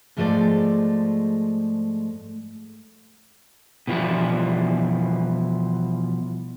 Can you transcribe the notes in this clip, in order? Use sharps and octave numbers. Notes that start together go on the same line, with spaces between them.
G#2 F3 G#3 A3 C5 D5
B2 E3 F3 G3 E4